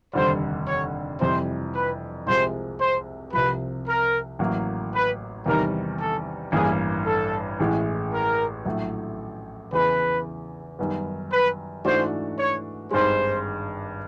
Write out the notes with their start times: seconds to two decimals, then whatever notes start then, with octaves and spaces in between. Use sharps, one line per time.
0.13 F1 D#2 D3 G3 C5
0.67 C#5
1.20 F2 C3 E3 G3 C5
1.74 B4
2.27 C2 C3 F3 G#3 C5
2.80 C5
3.33 C2 C3 F3 B4
3.87 A#4
4.39 A1 A2 F#3 A#3
4.93 B4
5.46 E2 C3 D#3 G3 A#4
5.99 A4
6.52 A1 G2 E3 G3 A#3 G#4
7.06 A4
7.60 A1 A2 E3 G#3
8.12 A#4
8.66 A#1 A2 F#3 A3
9.72 E2 C#3 E3 B4
10.79 F#2 D#3 G3 B3
11.32 B4
11.85 G#2 E3 A3 D4 F#4 C5
12.38 C#5
12.91 G#1 G2 D#3 G#3 C5